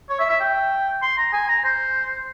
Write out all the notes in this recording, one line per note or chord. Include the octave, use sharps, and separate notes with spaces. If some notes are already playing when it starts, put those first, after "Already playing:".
C#5
E5
E5
G5
C6
A#5
G#5
A#5
C5